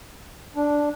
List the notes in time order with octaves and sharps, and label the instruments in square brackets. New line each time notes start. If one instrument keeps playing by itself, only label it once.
[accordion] D4